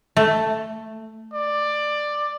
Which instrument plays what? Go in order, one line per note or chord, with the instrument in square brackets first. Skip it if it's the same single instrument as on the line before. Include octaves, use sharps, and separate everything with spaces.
[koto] A3
[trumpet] D5